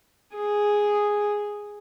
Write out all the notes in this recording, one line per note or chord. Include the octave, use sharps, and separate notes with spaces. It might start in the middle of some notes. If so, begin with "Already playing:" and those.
G#4